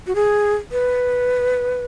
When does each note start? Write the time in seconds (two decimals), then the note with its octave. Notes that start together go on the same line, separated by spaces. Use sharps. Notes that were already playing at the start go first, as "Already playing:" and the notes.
0.07 F#4
0.15 G#4
0.72 B4